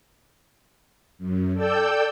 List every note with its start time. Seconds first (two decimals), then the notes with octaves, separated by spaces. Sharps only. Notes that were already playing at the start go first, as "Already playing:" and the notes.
1.18 F#2
1.54 A4 D5 G5 E6 G6